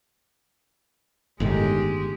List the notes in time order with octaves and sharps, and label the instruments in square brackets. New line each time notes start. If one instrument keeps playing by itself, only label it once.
[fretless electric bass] G1 A2 D#3 [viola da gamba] G#3 G4